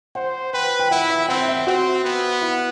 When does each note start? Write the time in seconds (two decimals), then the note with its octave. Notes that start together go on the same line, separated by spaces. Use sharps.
0.15 C5 F#5
0.53 B4 G5
0.79 G5
0.91 E4 F#5
1.10 E5
1.29 C4 F#5
1.48 E5
1.66 C4 F#4
2.04 B3
2.42 E4